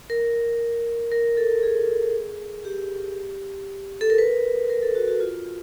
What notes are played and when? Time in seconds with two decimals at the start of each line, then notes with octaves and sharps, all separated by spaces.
0.10 A#4
1.12 A#4
1.37 A4
1.63 G#4
2.65 G4
4.01 A4
4.10 A#4
4.18 B4
4.70 A#4
4.82 A4
4.95 F#4
5.08 F#4
5.20 F4